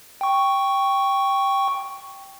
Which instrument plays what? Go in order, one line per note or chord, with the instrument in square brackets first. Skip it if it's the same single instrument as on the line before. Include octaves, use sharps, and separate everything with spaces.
[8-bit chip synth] G5 C#6